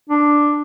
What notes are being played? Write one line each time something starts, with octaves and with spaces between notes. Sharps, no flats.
D4